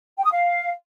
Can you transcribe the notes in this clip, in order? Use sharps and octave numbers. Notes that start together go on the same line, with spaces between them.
G5
D#6
F5